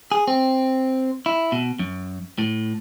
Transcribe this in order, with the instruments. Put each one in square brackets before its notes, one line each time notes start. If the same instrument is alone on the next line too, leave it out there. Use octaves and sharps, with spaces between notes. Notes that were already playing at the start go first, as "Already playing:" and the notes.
[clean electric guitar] G#4
C4
E4
B2
F#2
A2